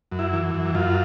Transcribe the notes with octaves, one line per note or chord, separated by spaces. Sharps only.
F#2
E4
E3
F#2
F#2 F4